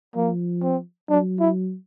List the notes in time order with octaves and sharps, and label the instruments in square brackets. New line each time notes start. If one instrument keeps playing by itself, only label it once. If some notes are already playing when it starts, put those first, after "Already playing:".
[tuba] F3 [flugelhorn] A#3
[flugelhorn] C4
[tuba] F#3 [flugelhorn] D4
[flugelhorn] E4